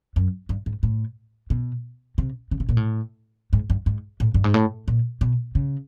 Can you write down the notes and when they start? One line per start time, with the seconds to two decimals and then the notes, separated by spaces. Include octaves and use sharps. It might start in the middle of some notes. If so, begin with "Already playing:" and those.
0.16 F#2
0.49 G2
0.66 G#2
0.83 A2
1.50 B2
2.18 C3
2.51 C#3
2.60 C3
2.69 A#2
2.77 A2
3.53 G#2
3.70 G2
3.86 G#2
4.20 A2
4.34 G2
4.44 G#2
4.54 A2
4.88 A#2
5.21 B2
5.55 C#3